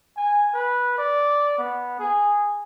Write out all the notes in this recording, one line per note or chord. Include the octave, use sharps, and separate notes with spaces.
G#5
B4
D5
B3
G#4